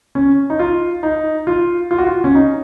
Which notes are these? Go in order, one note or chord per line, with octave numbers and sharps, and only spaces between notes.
C#4
D#4
F4
D#4
F4
F4
F#4
F4
C#4
D#4